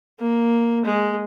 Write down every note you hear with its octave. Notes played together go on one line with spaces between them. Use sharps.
A#3
G#3